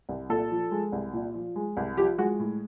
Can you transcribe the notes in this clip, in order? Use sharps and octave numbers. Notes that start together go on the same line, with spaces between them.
C2
A#2 A4
F3
G#3
C2
A#2
F3
G#3
C2
F3 G4
G#3 F#4
A2